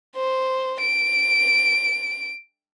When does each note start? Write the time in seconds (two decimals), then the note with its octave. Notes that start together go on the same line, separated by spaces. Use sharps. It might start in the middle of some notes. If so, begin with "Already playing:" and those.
0.16 C5
0.80 D7